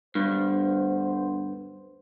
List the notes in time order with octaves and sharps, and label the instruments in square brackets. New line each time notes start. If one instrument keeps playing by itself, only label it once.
[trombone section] D2 B3 C5 [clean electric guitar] G2